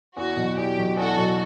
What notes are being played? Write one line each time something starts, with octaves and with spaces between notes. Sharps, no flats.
E2 F#4
B2 F#3
E2 G4
B2 F#3
E2 F#4 A4
B2 F#3